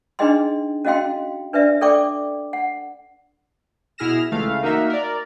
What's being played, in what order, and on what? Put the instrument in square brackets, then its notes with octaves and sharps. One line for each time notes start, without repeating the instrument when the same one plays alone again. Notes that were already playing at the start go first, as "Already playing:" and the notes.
[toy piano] D4 D#4 G#4 D#5 G5 C6
C#4 F#4 D#5 F5 G5 C6
D4 B4 D5 E5
A4 D5 G5 C#6 D6
F#5
[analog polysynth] B2 E4 G#4 F6 A#6 E7
C#2 E3 A3 F5
A#3 D#4 F#4 A#4 E5
A#4 D5